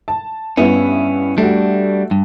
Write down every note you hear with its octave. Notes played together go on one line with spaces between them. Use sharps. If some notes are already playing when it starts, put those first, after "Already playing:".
A5
G2 B3 C#4 E4
G3 A3 D4 F#4
G2